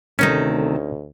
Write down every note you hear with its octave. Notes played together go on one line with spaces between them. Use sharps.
D2 C3 D#3 A3 C#4 D#4